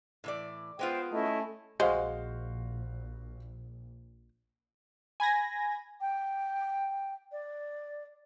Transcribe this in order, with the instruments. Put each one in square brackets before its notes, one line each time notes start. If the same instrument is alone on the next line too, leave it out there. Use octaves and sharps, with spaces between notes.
[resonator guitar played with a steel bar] A2 E3 D5
[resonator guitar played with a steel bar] G#3 B3 F4 [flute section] C5 G5
[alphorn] A3 [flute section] C#4 E4 D#5
[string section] A#1 [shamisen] G#3 [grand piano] F#4 C5 F5
[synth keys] G#5 B5 G#6 A#6
[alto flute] G5
D5